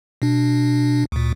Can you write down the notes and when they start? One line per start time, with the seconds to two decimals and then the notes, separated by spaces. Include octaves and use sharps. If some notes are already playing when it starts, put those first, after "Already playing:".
0.22 B2 D4
1.12 D2 A#2